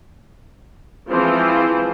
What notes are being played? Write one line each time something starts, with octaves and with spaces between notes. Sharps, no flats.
E3 F3 G#3 C4 F4 C5